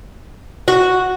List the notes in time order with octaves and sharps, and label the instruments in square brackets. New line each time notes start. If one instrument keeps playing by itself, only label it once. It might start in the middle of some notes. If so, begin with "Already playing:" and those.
[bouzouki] F#4